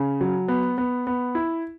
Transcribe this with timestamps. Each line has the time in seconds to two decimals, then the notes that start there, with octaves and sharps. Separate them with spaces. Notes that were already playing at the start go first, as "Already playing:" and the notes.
Already playing: C#3
0.21 F#3
0.48 B3
0.78 B3
1.07 B3
1.35 E4